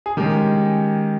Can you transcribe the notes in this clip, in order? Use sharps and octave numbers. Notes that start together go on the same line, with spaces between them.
G#4
D#3 G#3 C#4 G4